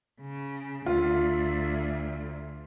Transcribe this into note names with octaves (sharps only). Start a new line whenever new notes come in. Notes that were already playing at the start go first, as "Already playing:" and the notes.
C#3
D2 F4